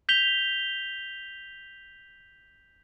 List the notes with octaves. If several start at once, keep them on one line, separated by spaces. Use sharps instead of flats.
G6 B6 F7 G7